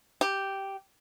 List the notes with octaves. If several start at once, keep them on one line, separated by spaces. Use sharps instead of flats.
G4